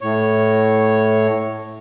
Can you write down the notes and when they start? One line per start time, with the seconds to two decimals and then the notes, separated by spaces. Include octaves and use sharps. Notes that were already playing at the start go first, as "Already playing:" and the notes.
0.01 A2 C#5